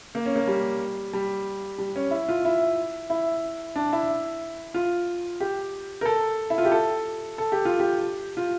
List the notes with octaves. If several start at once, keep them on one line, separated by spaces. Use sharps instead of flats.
A#3
C#4
A#3
G3
G3
G3
C#4
E4
F4
E4
E4
D4
E4
F4
G4
A#4
A4
E4
F4
G4
A4
A4
G4
F4
G4
F4